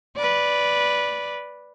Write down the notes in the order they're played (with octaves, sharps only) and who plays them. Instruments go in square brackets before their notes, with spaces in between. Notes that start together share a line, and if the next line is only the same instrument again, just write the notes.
[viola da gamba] B4 D5